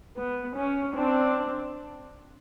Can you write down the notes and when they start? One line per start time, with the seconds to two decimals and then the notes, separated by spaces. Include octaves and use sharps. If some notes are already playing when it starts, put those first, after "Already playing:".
0.18 B3
0.56 C#4
0.94 C4 D4